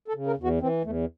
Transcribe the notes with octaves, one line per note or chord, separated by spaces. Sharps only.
A4
C#3
A#4
E2
F#4
E3 C4
E2 A3